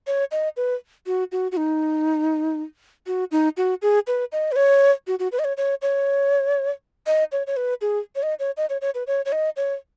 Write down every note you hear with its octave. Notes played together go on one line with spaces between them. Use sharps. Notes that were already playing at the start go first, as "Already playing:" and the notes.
C#5
D#5
B4
F#4
F#4
F#4
D#4
F#4
D#4
F#4
G#4
B4
D#5
B4
C#5
F#4
F#4
B4
D#5
C#5
C#5
C#5
D#5
C#5
C#5
B4
G#4
C#5
D#5
C#5
D#5
C#5
C#5
B4
C#5
C#5
D#5
C#5